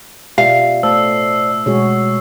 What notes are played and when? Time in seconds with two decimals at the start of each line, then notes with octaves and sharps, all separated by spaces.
0.38 B2 F4 G4 D5 E5 F5 C7
0.83 A3 C5 D5 A5 E6
1.66 B2 G#3 F#4 G#4 C#5